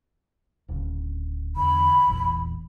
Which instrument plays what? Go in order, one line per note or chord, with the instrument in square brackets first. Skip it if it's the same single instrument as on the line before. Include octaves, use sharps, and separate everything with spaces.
[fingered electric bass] D1 C#3
[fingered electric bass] E2 D3 [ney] B5
[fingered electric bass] E1 A#1 E2